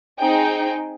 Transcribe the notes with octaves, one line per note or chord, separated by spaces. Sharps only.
C4 D#4 G#4 G5